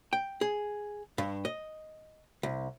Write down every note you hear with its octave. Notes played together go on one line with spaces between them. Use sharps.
G5
G#4
G2
D#5
C2